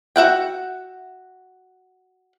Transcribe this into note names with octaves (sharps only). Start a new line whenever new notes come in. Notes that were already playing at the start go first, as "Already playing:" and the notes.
F#4 E5 F#5 G5